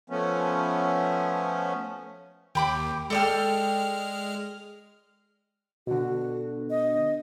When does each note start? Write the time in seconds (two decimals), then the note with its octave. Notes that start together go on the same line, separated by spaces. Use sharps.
0.10 F3 A3 B3 C#4
2.55 D#2 G4 B5 D6
3.10 G#3 A4 D5 G5 F6
5.87 B2 D3 F#4
6.70 D#5